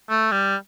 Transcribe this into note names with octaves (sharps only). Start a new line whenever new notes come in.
A3
G3